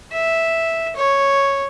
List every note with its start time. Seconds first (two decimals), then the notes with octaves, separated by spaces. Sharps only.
0.12 E5
0.96 C#5